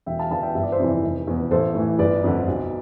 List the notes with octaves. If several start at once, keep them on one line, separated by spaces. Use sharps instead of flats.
E1 E5 G5
F5 A5
E2 D3 F5 A5
E5 G5
G1 E5
D5
C5 E5
F2 C3 E3
F1
E2 B2
A1 A4 C5
A2 E3
G1 B4 D5
F2 D3
B1